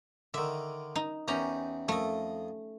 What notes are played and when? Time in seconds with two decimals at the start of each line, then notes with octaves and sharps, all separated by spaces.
0.34 D3 D#3 E5
0.96 D#4
1.28 E2 C#4 D#4 G4 A#5
1.88 F2 A3 D#5